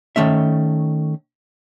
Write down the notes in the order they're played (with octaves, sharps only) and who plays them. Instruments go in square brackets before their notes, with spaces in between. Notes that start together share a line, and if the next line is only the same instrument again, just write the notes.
[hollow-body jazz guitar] D#3 A3 C#4 E5